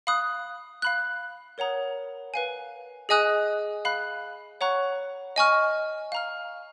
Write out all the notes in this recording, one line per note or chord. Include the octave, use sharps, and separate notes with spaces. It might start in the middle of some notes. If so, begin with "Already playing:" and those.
F5 B5 D#6 F#6
F5 B5 F#6
A#4 C#5 F#5 A#5 D#6
B4 F5 G#5
G#4 D#5 G#5 D#6 F#6
F5 B5 F#6
C#5 F#5 A#5 C#6 F#6
D#5 G#5 C#6 F6
F5 A#5 F6